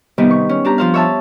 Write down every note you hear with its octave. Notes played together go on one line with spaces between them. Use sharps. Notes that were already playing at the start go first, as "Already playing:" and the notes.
C3 D#3 G3 B3
C#6
C#4
D4 G4 A#5
F3 C5 F5
C#5 E5 A5